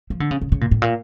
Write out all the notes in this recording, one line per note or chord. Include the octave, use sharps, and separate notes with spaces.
F3
D3
C#3
C#3
C#3
A#2
A2
A#2